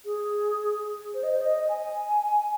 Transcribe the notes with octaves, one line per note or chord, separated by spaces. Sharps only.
G#4
C5
D#5
C5
D#5
G#5